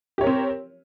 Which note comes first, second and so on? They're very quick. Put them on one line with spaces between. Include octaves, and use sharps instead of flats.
G4 C#5 A#4 C4